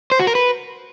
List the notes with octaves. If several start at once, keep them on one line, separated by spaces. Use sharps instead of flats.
C5
F#4
A#4
B4